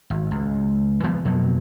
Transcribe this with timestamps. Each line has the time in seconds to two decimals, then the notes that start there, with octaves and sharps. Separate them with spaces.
0.10 G#1
0.31 C#2
1.03 E3 F3 B3
1.25 F2 B2 F#3 A#3